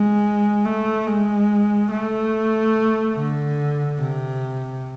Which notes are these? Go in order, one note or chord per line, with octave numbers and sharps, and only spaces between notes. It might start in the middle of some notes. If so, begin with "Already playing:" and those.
Already playing: G#3
A3
G#3
A3
D3
C3